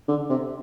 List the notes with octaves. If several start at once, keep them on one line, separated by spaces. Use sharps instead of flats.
D3
C3